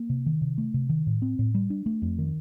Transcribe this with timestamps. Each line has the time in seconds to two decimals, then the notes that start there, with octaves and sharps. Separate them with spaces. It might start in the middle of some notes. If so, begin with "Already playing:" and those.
Already playing: A#3
0.10 C3
0.26 D#3
0.41 C3
0.58 A3
0.74 C3
0.89 D#3
1.07 A2
1.22 C4
1.39 A2
1.54 G3
1.70 D4
1.86 A3
2.02 F2
2.18 D#3